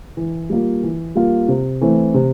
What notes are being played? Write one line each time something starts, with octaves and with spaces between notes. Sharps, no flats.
E3
G3 A#3 F4
E3
G3 A#3 F4
C3
E3 A3 C4
C3